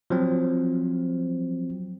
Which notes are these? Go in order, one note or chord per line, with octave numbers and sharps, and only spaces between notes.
F3 F#3 C4